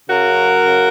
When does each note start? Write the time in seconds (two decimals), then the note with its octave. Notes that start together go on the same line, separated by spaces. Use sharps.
0.09 C#3 F#4 A#4
0.28 F#2
0.45 F#3
0.64 C#3